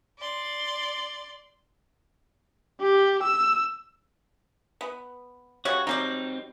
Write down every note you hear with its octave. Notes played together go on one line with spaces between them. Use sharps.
D5 C6
G4
E6
B3
C#3 G3 F#4 C#5
F#3 G3 C4 D#4 D5